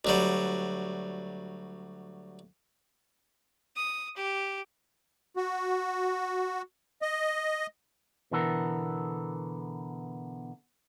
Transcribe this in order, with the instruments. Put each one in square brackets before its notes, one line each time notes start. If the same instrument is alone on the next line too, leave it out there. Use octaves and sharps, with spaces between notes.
[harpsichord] D2 F#3 G3
[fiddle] D#6
G4
[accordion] F#4
D#5
[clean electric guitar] B2 D3 E3 B3 A4 A#4